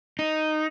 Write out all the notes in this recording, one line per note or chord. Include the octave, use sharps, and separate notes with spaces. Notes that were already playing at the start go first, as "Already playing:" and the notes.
D#4